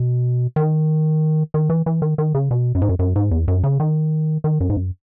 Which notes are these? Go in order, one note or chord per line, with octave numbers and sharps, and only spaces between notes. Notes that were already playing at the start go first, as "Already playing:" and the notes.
Already playing: B2
D#3
D#3
E3
E3
D#3
D#3
C#3
B2
F#2
G#2
F#2
F#2
G#2
E2
F#2
C#3
D#3
D#3
F#2
G#2
F#2